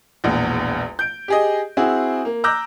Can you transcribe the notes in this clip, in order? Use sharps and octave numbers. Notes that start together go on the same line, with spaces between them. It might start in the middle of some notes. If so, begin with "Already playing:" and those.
E1 A#1 E2
G6 D7
G4 G#4 D#5
C4 E4 F#4 G#4
A#3
A#5 D6 E6 F#6 G6 A#6